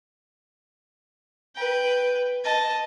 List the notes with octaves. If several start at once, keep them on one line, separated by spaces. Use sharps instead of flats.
B4 G5
D#5 A5